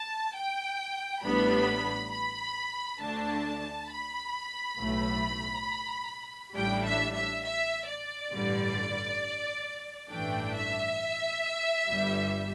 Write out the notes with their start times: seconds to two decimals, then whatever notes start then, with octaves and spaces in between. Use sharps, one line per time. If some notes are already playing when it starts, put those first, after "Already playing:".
Already playing: A5
0.35 G5
1.23 A1 A2 G3 B3 D4 B5
2.12 B5
3.01 D2 D3 A3 D4 A5
3.90 B5
4.78 B1 A2 A3
6.55 A1 A2 G3 D4 G5
6.85 E5
7.14 E5
7.44 E5
7.89 D5
8.32 A1 G2 D3 G3
10.10 A1 G2 E3 A3 D4 G5
10.54 E5
11.88 G1 G2 G3